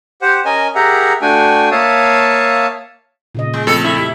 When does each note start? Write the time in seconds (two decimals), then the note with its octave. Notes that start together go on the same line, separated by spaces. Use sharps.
0.22 G4 C5 F#5
0.45 C#4 A#4 D#5 G#5
0.75 G4 G#4 A#4 E5 F#5 A#5
1.22 A3 D4 F#4 G5 G#5
1.71 A#3 C#5 E5 F5 A5 D#6
3.35 A#2 C#3 D#5
3.54 G#3
3.67 F2 A3 A4
3.84 E4
3.99 G4